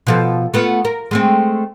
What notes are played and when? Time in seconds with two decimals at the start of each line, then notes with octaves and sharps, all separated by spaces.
0.07 B2 F3 A4
0.54 A3 B3 F4
0.85 A#4
1.11 G#3 A3 C4